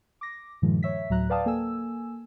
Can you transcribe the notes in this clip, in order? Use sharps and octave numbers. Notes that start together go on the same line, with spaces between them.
D6 A#6
G2 A#2 D#3 F3 G#3
C#5 E5 B6
D2 A2 F#3 E5 A#5 F#6
B4 D5 F5 G5 A5 D#6
A#3 A4 G#5 E6